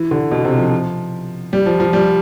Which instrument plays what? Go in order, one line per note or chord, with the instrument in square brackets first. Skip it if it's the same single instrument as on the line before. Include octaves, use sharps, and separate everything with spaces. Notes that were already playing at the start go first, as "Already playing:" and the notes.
Already playing: [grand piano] E3
D3
B2
C3
F3
G3
F3
F3
G3